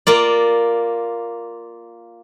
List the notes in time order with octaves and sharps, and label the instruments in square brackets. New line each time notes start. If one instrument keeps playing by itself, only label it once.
[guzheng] A#3 F4 D5